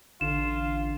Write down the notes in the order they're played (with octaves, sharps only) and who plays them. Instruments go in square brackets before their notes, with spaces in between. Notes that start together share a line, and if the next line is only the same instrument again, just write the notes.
[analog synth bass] A1 [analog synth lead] D3 [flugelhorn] F4 [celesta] E7